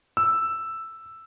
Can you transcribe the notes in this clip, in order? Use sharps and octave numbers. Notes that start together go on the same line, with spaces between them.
E6